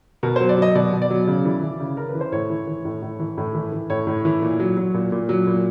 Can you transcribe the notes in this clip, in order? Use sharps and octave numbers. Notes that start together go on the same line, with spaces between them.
B2 A#4
F#3 C5
D5
F#3 D#5
B2 D5
B2
D5
F#3
C#3
E3
E3
C#3
C#3 A#4
B4
E3
C5
A2 C#5
E3
E3
A2
A2
E3
A2
E3
E3
A2 C#5
A2
E3
A#2
F#3
F#3
A#2
A#2
F#3
A#2